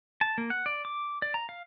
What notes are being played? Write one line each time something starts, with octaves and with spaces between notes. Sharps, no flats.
A5
A#3
F#5
D5
D6
D5
A#5
F5